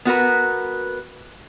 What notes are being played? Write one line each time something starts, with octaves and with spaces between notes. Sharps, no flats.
B3 F#4 A#4 B4